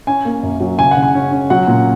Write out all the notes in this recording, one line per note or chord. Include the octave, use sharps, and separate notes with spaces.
C#4 G#5
A#3
F#2
F#3
C#3 G#5
F#5
C#3
G#5
C#4
C#4
F#3 F#5
A#2